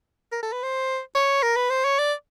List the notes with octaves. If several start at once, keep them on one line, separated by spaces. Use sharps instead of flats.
A#4
A4
B4
C5
C#5
A#4
B4
C5
C#5
D5